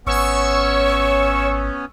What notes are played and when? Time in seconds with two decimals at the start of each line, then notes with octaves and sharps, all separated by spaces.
0.07 G#1 B3 C#4 C#5 C#6 E6